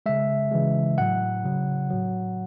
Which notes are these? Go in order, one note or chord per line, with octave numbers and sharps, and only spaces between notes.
C#3 G#3 E5
C#3 E3 G#3
A2 F#3 F#5
C#3 F#3
A2 F#3